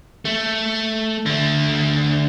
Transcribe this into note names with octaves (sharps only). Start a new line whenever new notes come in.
A3
D3 A3